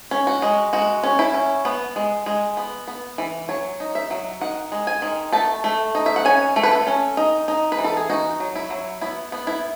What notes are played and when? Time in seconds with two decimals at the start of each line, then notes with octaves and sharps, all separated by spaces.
0.11 C#4
0.27 F#4
0.42 G#3
0.73 G#3 F#4
1.03 C#4
1.19 E4
1.34 C#4
1.65 B3
1.96 G#3
2.26 G#3
2.57 B3
2.88 B3
3.18 E3
3.49 F#3 C#5
3.80 D#4
3.95 E5
4.10 F#3
4.41 D#3 F#5
4.72 G#3
4.87 G#5
5.02 D#3
5.32 A3 A5
5.64 A3
5.95 D#4
6.06 E5
6.16 F#5
6.25 C#4 G#5
6.56 A3
6.63 B4
6.71 A4
6.87 C#4
7.17 D#4
7.48 D#4
7.72 B4
7.79 E3
7.84 A4
7.97 G#4
8.10 D#4 F#4
8.40 F#3
8.56 E4
8.70 F#3
9.01 B3 E4
9.32 B3
9.47 E4